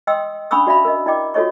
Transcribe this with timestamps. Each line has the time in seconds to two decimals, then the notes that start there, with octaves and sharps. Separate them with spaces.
0.07 D#5 G5 C6 D#6 E6
0.51 C#4 D4 B5 C#6 D#6 E6
0.67 F#4 D5 E5 F5 B5
0.85 A#4 D#5
1.06 E4 D5 D#5 G5 D6
1.34 F4 F#4 A4 C#5 D#5 C#6